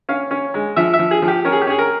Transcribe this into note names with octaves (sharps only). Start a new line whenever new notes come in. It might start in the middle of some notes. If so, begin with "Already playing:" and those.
C#4 F5
C#4
G#3
F3 E5
E5
F3
G#4
F3
G4
C#4 A#4
G#4
G4
C#4 G#4
A#4